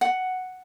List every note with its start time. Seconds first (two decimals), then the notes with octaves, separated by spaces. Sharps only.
0.01 F#5